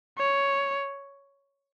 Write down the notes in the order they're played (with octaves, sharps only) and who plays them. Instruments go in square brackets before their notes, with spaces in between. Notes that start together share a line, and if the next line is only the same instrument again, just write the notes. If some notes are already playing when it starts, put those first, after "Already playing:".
[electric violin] C#5